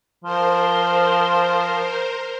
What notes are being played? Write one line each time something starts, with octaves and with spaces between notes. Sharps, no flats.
F3 A#4 C5